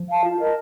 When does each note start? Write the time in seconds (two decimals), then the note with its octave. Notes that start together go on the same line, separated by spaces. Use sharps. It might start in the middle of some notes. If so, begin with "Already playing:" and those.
Already playing: F3
0.09 F5 A5
0.24 F4
0.39 A#4 D#5 A5